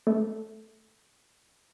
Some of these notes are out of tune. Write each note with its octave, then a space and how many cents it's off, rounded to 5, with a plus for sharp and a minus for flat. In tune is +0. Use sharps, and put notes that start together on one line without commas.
A3 +0